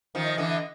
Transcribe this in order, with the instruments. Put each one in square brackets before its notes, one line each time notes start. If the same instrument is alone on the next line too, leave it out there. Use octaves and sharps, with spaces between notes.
[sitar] D#3 F3
[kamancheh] D#5
[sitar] D3 E3